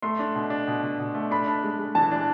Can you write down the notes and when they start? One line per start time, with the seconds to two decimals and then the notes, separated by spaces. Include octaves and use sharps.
0.02 A3 C6
0.19 D4
0.35 B2
0.50 D4
0.67 B2
0.83 B2
0.99 B2
1.15 A3
1.31 D4 B5
1.47 D4
1.64 G#3
1.79 G#3
1.95 E3 A5
2.11 D4